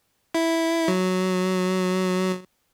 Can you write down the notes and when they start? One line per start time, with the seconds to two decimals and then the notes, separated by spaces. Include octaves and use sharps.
0.34 E4
0.88 F#3